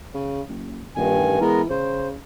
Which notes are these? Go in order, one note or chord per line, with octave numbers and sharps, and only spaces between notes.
C#3
F#1
D#1 G2 D#3 G#5
A1
E3 G#3 B3 A#4
C#3 C5